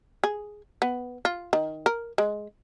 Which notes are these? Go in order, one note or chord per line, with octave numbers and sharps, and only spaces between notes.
G#4
B3
F4
D#3
A#4
G#3